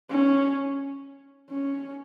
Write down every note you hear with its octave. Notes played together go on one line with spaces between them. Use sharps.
C#4
C#4